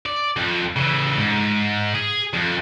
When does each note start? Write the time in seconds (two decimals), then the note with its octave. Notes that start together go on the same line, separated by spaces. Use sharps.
0.06 D5
0.36 F2
0.76 C#3 E3
1.18 G#2
1.95 G#4
2.34 F2